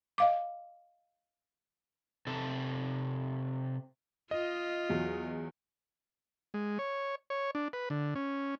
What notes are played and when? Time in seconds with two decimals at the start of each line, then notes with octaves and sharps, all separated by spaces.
0.18 D#5 F5 D6
2.27 C3 A4
4.31 F4 D#5
4.89 E2 F#3
6.54 G#3
6.79 C#5
7.30 C#5
7.55 D4
7.73 B4
7.90 D3
8.15 C#4